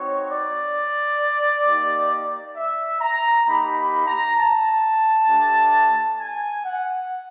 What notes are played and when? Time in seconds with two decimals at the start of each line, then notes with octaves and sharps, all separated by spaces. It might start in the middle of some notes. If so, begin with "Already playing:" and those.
Already playing: C4 D#4 F#4 C#5
0.29 D5
1.65 A#3 D#4 G4
2.56 E5
3.01 A#5
3.46 A#3 D#4 G4 B5
3.76 B5
4.06 A#5
4.37 A5
5.27 A3 D4 G4
6.18 G#5
6.64 F#5